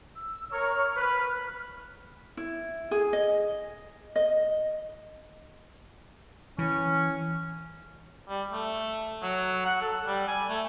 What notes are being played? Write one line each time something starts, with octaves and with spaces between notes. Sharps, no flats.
E6
A#4 C#5 F6
B4
E4
G#4
D#5
D#5
E3 C#4
G3
A3
F#3
F#5
A4
G3
G#5
A3